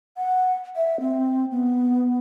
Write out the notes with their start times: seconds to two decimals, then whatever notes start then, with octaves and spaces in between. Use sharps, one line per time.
0.18 F#5
0.76 E5
1.00 C4
1.51 B3